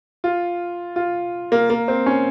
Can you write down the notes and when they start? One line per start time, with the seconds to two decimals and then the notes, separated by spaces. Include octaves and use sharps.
0.24 F4
0.96 F4
1.52 A#3
1.70 A#3
1.88 C4
2.06 C#4